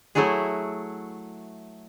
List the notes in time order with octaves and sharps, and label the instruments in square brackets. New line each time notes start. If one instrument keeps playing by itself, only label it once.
[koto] F#3 A3 E4 F#4 G#4